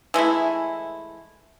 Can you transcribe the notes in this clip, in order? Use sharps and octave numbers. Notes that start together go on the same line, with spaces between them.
E3 G#3 A3 E4